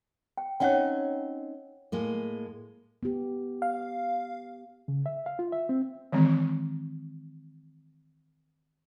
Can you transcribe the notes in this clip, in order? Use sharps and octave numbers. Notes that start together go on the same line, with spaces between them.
G5
C4 C#4 D#4 C#5 F#5 G5
A2 G#3 A#3
B3 G4
F5
C#3
E5
F5
F4
E5
C4
D#3 E3 G#3 C4